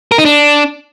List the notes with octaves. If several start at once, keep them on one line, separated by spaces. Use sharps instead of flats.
A#4
D#4
D4